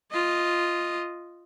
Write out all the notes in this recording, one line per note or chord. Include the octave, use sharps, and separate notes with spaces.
F4 D#5